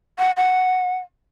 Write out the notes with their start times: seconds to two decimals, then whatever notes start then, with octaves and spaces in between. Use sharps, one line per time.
0.19 F#5
0.37 F#5